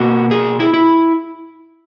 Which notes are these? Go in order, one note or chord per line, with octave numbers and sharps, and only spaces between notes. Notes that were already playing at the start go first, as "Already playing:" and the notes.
Already playing: B2 A#3 F#4
G#4
E4
E4